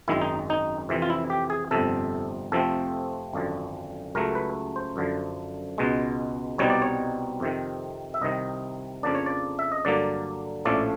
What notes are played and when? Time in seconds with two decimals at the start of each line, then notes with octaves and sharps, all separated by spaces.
0.08 G#1 F#2 D#3 G#3 E4
0.21 D#4
0.50 D#4
0.89 F2 C3 E3
1.02 F4
1.10 E4
1.30 G4
1.50 G#4
1.71 G1 F2 C3 A4
2.52 F2 C3 F3 A3 C4 A4
3.33 G#1 F#2 D3 F3
4.15 C#2 C#3 F#3 A3 A#4
4.35 B4
4.76 C5
4.96 F#2 D3 F3
5.78 C#2 B2 G#3
6.58 C2 B2 G3 C4 D#4 C#5
6.70 D5
6.82 C#5
7.40 F2 C3 D#3
8.14 E5
8.21 C2 C3 D#3 D#5
9.03 F2 C#3 F3 A#3 D4 D5
9.15 C#5
9.26 D5
9.59 E5
9.72 D#5
9.85 G2 D3 F#3 A#3 D5
10.65 A#1 A2 F3 A3 C#4 D5